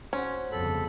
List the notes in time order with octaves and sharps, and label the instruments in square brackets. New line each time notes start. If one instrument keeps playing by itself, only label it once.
[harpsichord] C4 F#4 [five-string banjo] C#4
[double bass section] G1 F2 C#3 [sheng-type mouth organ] A4 B5